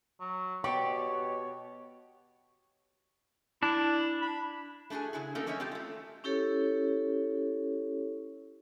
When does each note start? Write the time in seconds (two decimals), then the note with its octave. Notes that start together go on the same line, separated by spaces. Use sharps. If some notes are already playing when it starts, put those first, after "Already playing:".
0.20 F#3
0.64 B2 G4 C#5 D5 C#6
3.63 D4 E4
4.22 B5
4.90 A3 D4 F#4 G#4 G#5
5.13 C#3 E4 F#4 G#4
5.35 A3 A#3 C#4 D#4 A4 A#4
5.46 F#3 G3 C#4 C#5 D#5 E5
5.60 C4 F4 G4 A4
5.71 A3 F4
6.24 C#4 E4 G4 A4 C#5